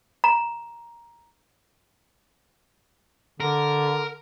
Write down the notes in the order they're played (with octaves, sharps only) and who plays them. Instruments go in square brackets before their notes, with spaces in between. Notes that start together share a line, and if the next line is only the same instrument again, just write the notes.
[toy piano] A#5
[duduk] D3 [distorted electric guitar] A#4